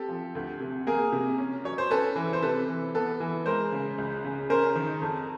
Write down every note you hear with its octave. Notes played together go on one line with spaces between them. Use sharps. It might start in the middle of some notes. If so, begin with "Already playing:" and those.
Already playing: C4 G4 A4
F3
D2
C3
A#3 G#4 A#4
C3
C#4
F#3 C#5
C5
C#4 A4 B4
E3
C5
C3 A4 B4
E3
B3 A4 B4
E3
G#3 A#4 C5
C#3
C#2
C#3
C#4 A#4 C5
D#3
F2